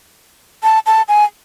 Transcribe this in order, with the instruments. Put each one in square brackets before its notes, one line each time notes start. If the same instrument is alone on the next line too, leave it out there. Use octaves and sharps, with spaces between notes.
[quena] A5
A5
G#5